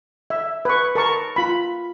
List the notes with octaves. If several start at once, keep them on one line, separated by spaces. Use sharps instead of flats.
E5
B4 C#6
A#4 A5 C#6
F4 B5